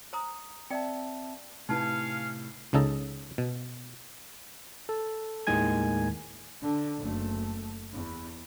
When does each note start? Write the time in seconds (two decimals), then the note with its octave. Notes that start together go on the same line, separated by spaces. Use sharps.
0.13 C5 A#5 D#6
0.70 C4 D5 E5 G5 A5
1.69 A2 C3 C#4 D#4 B4 F5 A5
2.73 C#2 C#3 D#4 A4 D#5
3.38 B2
4.89 A4
5.47 D#2 A2 D#3 G#3 G#5 G#6
6.62 D3
6.99 F#1 A3
7.93 E2